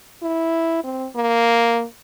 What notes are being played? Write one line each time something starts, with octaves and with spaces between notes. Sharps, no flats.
E4
C4
A#3